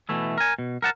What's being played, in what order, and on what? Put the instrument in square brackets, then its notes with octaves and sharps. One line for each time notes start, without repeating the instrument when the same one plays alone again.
[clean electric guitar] B2 E3 A3 E4
A#4 G#5
B2
A#4 F#5 A5